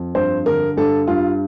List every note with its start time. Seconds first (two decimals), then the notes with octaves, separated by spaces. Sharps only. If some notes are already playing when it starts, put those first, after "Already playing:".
Already playing: F2
0.15 G2 C5
0.46 D3 A#4
0.77 G2 A4
1.07 G2 F4